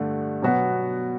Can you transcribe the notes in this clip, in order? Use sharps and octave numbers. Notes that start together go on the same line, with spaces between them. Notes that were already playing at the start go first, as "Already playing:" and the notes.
Already playing: G2 D3 A3
B2 F#3 B3 F#4